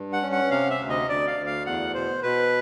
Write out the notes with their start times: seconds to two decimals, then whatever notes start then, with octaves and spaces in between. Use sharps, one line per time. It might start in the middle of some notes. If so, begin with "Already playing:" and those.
Already playing: G2
0.13 F#5
0.22 C#4
0.32 F#5
0.51 C3 F5
0.70 E5
0.80 D2
0.89 D#5
1.09 D2 D5
1.27 F5
1.37 D2
1.46 F5
1.66 E2 F#5
1.94 B2 C5
2.23 B2 B4